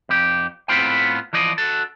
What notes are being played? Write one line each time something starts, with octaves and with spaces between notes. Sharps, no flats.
F2 G4
A2 B3 C4 F4 C5 G5
E3 F3 D5 D#5
F#4 A4